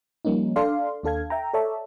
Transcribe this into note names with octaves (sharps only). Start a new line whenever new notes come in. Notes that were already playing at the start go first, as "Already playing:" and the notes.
F3 G3 A#3 C#4 D#4
D4 A4 D5 F5 C6
D#2 D4 A4 F5 G#6
E5 G5 A#5
A4 C#5 D5 E5 A5